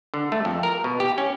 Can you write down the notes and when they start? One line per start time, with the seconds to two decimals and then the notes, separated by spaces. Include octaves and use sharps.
0.14 D3
0.32 A3
0.45 F2
0.63 A#4
0.84 B2
1.00 G4
1.18 C#4